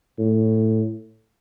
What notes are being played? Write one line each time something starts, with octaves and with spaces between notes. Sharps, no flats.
A2